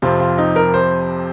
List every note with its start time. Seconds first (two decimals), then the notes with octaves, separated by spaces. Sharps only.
0.02 F2 C3 F3 C4 F4
0.20 F4
0.38 D#4
0.56 A#4
0.74 C5